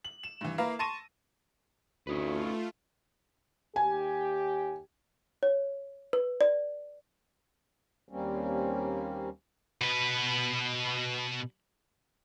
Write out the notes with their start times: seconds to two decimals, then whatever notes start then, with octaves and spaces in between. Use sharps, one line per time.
0.04 F#7
0.23 E7
0.41 G2 E3
0.58 A#3 E4 B4 F5 A#5
0.79 A5 C6 C#6 A#6 D#7
2.07 D2 A3 C#4 D#4 F4 B4
3.76 D#2 G4 G#5
5.43 C#5
6.13 B4
6.41 D5
8.09 D#2 G3 A#3 C4 C#4
9.81 B2 B4